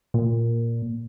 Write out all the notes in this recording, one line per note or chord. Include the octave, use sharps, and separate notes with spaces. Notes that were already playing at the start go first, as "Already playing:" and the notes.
A#2